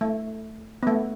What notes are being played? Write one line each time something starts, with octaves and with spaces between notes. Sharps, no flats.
A3
B3
A3